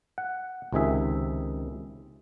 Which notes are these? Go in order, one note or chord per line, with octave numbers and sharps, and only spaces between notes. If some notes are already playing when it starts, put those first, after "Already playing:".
F#5
C#2 C3 D#3 G#4 E5